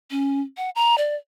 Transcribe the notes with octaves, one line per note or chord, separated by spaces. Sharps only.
C#4
F#5
A#5
D5